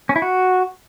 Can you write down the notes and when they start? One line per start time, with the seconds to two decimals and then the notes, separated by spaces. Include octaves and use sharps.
0.09 C#4
0.16 E4
0.22 F#4